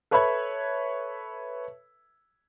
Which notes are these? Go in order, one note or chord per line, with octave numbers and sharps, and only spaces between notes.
A4 B4 C#5 E5 B5 G#6